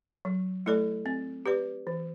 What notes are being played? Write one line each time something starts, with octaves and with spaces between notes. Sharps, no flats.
F#3
A3 E4 A4 D5
C4
G4 B4 D5
E3